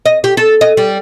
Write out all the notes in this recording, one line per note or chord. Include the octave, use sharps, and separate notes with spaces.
D#5
G4
A4
D#5
G3